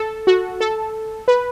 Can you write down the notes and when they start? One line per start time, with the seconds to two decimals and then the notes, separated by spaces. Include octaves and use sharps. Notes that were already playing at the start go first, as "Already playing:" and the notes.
Already playing: A4
0.27 F#4
0.61 A4
1.28 B4